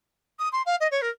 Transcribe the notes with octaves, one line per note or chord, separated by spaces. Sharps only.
D#6
C6
F5
D#5
C#5
A#4